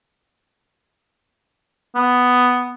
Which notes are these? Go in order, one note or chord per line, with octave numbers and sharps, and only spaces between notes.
B3